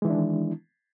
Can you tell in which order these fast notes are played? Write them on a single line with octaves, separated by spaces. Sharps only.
G#3 E3 E4 D4 D#3